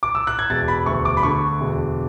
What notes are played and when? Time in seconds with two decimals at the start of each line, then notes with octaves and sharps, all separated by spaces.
0.03 D6
0.15 E6
0.27 F#6
0.39 G#6
0.50 E1 A6
0.68 B5
0.86 D2 C#6
1.05 D6
1.17 B5
1.23 D3 C#6
1.61 E1